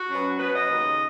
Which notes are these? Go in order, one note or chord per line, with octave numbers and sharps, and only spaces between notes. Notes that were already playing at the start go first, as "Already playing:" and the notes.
Already playing: F#4
F#2 F#3 B3
B2 F#3 B3 B4
D#5
D#2 C#3 G#3